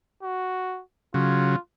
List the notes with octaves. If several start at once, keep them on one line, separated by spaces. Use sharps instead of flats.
F#4
C#3 F#3 F4